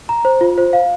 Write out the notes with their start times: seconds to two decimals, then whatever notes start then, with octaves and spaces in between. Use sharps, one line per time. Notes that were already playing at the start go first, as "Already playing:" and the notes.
0.09 A#5
0.25 C5
0.41 F4
0.58 C5
0.73 F5